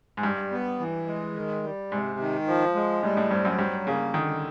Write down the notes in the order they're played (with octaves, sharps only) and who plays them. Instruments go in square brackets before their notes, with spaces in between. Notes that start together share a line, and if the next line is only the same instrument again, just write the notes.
[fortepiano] G#2
[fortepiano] G2 [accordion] G3
[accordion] B3
E3
G#3
D#3
G3
[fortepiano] G#2 [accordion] C3
[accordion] D#3
F3
G#3
[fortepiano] A2 [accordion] G3
[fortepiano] A2
[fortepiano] G2 [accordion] C4
[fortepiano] F#2
[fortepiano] G2 [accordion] F#3
[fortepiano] C#3 [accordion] A#3
[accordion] D3 [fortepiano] D#3